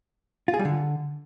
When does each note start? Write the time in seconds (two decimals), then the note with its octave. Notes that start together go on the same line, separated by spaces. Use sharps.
0.48 F4
0.54 G#4
0.59 G3
0.65 D3